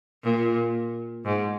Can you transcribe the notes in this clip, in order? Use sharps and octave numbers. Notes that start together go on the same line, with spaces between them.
A#2
G#2